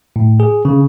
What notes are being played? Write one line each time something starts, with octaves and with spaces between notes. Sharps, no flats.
A2
G#4
C#3